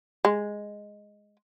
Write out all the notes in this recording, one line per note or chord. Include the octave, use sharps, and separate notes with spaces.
G#3